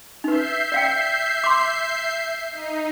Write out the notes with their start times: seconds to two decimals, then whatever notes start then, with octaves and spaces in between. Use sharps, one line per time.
0.24 D#4 B4 E5 G6 C7
0.72 D5 F5 G5
1.44 C6 D6
2.52 D#4